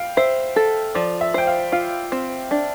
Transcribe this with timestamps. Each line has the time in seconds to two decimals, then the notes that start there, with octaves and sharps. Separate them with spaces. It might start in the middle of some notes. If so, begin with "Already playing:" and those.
Already playing: F5 G5
0.17 C5 E5
0.56 A4
0.95 F3 D5
1.21 E5
1.34 C5 G5
1.47 F5
1.72 F4 F5
2.12 C4
2.51 D4